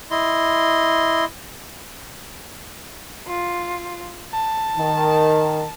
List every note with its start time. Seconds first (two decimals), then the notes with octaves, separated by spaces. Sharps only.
0.11 E4 D#5 C6
3.27 F4
4.32 A5
4.77 D#3